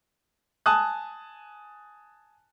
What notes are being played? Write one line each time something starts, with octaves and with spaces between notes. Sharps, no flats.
G#5 A5 D#6 F#6